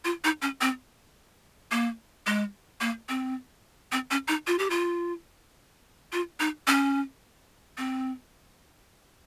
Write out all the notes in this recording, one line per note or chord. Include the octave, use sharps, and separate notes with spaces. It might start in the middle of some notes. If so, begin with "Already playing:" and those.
F4
D#4
C#4
C4
A#3
G#3
A#3
C4
C4
C#4
D#4
F4
G4
F4
F4
D#4
C#4
C4